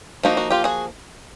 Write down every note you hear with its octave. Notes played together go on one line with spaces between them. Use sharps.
F3 A#3 D#4 F#4
F#4
F4 G4
F#4 G#4